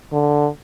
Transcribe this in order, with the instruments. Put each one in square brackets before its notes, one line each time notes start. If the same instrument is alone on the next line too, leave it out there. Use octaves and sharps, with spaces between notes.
[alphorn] D3